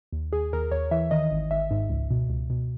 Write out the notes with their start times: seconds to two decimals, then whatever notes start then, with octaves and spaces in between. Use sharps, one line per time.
0.12 D#2
0.33 D#2 G#4
0.53 D#2 A#4
0.72 D#2 C#5
0.91 E3 E5
1.11 D#3 D#5
1.31 G#1
1.51 G#1 E5
1.71 G#2
1.90 C#2
2.11 B2
2.30 C#2
2.50 B2